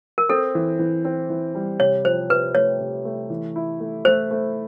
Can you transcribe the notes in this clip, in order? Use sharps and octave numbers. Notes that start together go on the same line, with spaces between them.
A#4
C4 A4
E3
E3
C4
E3
G3
C3 C#5
F3 C5
C3 B4
A3 C#5
C3
A3
E3
E4
A3
A3 C5
A3